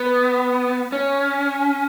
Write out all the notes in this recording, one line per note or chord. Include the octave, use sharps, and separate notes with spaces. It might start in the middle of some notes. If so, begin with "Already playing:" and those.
Already playing: B3
C#4